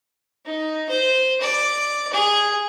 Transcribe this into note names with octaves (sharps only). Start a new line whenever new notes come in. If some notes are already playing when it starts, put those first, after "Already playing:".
D#4
C5
D5
G#4